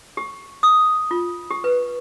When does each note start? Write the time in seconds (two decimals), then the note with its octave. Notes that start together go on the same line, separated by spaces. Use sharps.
0.17 G4
0.63 D#6
1.11 F4
1.51 G4
1.64 B4